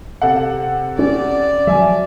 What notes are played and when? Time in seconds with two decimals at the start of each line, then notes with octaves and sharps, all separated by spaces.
0.22 C3 A4 F#5
0.99 C#4 D5
1.67 F3 F#3 E5 G#5